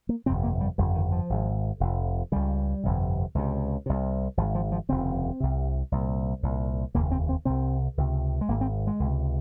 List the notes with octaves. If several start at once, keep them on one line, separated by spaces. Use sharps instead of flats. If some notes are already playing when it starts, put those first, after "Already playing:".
A#3
G1 F2 C3 C4
A#3
G3
G1 F2 C#3 G3
D#3
F3
G#1 G#2
F1 F2 C3
C#2 C#3 G3
G1 F2 C3
C#2 C3
C2 C3
G#1 G#2 F3
F3
F3
F1 D#2 C#3 C4
C2 C3
C2 A#2
C2 A#2
F1 D#2 C#3 A#3
C4
C4
C2 C3 C4
C#2 C3
G#3
G#1 G#2 A#3
C4
G#3
C#2 C3